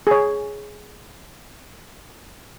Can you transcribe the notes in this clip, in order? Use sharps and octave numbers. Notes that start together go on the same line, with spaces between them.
G#4 C#5